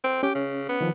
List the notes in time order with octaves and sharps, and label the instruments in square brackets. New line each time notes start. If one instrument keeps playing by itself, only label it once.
[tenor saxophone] C4
[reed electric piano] C#4 [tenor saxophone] G4
[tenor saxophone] C#3
B3
[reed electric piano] D#3 F3